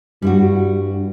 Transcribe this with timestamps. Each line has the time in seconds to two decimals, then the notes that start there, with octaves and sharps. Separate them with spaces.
0.22 G2 G3 E4 F#4